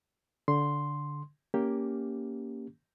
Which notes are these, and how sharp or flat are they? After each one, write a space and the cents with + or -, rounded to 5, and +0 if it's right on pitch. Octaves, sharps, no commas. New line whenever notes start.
D3 -15 C6 +0
A#3 +0 C#4 +15 G4 +0